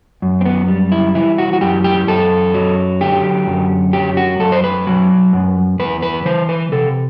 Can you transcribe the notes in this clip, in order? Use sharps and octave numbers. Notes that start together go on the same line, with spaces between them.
F#2
C4
B3
G3
E4
E3 E4
F#4
F#4
F#2 G4
G4
F#2 A4
F#3
D3 G4
F#2
F#3 G4
F#4
F#2 A4
C5
B4
F#3
F#2
E2 B4
B4
E3 C5
B4
C3 A4